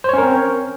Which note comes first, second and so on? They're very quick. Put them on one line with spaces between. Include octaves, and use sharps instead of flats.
C5 C#5 C#4 A#4 C4